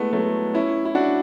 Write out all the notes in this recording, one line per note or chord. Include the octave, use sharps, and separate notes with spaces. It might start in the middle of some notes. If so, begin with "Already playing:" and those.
Already playing: G#3 A3 B3 E4
F#3 A3
C#4 E4
E4
D4 F#4